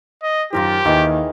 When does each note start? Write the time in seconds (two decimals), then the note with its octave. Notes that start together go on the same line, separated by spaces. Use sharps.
0.23 D#5
0.53 F#2 D#3 F4 G4 A#4 C5
0.85 D#2 D#3 E3 D#4 G#4